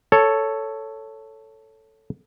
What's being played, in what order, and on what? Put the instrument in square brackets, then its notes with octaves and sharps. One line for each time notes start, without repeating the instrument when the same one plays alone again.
[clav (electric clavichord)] A4 C#5